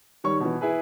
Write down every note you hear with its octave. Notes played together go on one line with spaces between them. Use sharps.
D#3 G3 C#5 C#6
B2 E3
E4 G#4 B4